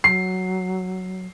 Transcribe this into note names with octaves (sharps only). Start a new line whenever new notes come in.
F#3 C7